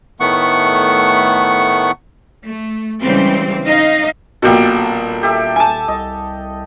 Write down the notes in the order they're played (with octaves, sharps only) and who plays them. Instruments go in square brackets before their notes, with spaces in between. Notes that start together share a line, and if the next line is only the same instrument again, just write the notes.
[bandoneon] A2 D#3 A3 B3 F#5 C#6
[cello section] A3
C#3 E3 G3 G#3 C4
D#4 D#5 F5
[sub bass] D#1 [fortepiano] A#1 B2 [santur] G4 A4
[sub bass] D#1 [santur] G4 A4 E5
[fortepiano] G#5 A5
[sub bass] C2 [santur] D#5